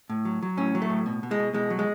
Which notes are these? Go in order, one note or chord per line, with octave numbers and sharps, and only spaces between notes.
A2
F#3
F#3
A2 C#4
F#3
A3
A2
B2
B2
G#3
B2
B2 G#3
F#3
G#3